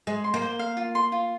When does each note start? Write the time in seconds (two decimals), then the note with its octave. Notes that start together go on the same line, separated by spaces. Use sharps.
0.07 G#3 C6
0.24 C6
0.34 A#3
0.42 C5
0.59 F5
0.77 F4
0.95 C6
1.12 F4